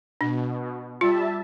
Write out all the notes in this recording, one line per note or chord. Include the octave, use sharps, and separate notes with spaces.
B2 D4
G3 F4 E5 A5